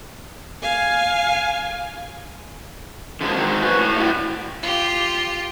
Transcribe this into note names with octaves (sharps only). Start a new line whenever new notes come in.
F5 G#5
D3 F3 G#3 A#3
G#2 D3 D#3
F#4 B4 C5 G#5
A2
A3 E4 F#4 D5 G5
F4 G4